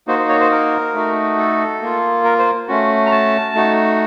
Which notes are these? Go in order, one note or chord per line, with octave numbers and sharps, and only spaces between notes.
A#3 D#4 F#4 C5
C5
C#5
C5
A#4
A3 D#4 F#4
A4
A#3 F4
A#4
C5
A3 C#4 F#4
A#5
A5
A3 D#4 F#4